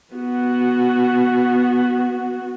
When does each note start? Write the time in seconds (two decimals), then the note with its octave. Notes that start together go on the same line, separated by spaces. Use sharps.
0.14 B3 F#4